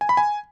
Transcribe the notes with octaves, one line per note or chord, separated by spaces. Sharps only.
G#5
B5
G#5